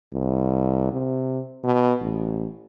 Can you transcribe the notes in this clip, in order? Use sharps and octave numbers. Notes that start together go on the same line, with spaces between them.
C2
C3
B2
A1